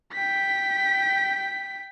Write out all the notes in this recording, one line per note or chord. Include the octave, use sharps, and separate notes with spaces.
G5 B6